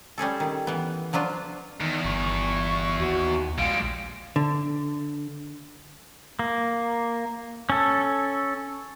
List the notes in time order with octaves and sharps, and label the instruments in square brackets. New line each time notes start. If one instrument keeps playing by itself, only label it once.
[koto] G3 C#4 G#4 A4
D#3
E3 B3
F3 F#3 D4 F4
[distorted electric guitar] E2 [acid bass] D#3
[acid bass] G1 [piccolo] C#6
[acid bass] D#2 [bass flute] F#4
[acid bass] A#1 [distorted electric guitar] G3 G#3 [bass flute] F5 [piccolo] D7
[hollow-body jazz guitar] D3
[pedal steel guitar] A#3
C#4 A4